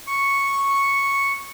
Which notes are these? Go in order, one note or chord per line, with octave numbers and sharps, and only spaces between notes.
C#6